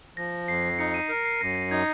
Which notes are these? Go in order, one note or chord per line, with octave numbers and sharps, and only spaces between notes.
F3 A#6
F2 C7
D#4 C#7
D#7
A#4 C7
C7
F#2 A#6
A#6
D#4 G#6